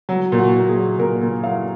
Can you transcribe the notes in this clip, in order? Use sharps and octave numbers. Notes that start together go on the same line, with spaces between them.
F#3
A#2
F#4
A#2
G#4
F#3
A#2 A#4
A#2
F#3 F5